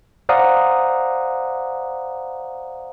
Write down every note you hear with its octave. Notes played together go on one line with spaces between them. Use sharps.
C5 D5 F5 F#5 A#5 D#6